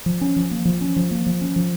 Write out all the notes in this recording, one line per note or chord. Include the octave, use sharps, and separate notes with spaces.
F3
C#4
F3
A#3
F3
C#4
F3
A#3
F3
C#4
F3